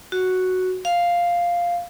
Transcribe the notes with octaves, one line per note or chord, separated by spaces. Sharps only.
F#4
F5